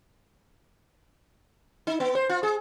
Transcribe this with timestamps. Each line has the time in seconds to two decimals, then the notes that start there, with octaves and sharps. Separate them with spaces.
1.87 D#4
2.00 B3
2.15 C5
2.30 F4
2.43 G#4